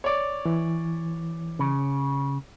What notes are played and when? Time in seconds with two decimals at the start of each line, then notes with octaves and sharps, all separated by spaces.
0.04 C#5 D5
0.46 E3
1.59 C#3